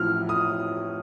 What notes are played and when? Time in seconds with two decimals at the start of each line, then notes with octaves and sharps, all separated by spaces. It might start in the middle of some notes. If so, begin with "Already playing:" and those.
Already playing: A1 A2 F3 F6
0.29 D#6